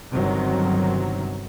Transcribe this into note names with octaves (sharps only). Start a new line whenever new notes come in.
G1 C3 D#3 F#3